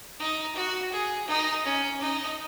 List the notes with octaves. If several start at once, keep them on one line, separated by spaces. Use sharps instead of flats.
D#4
F#4
G#4
D#4
C#4
D#4